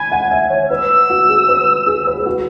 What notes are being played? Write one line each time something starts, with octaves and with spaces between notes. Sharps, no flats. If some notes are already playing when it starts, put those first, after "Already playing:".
Already playing: G#5 B5
F#5
E5
C#5
B4 E6
F#4
G#4
B4
G#4
B4
G#4
F#4